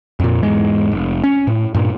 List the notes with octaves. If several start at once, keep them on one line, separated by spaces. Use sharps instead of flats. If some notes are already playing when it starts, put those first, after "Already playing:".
F2 A#2
E2 G#2 G#3
F1
C#4
A2
G2 A#2